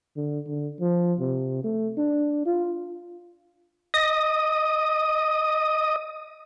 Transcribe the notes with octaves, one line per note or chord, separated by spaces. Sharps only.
D3
D3
F3
C3
A3
D4
F4
D#5 D#6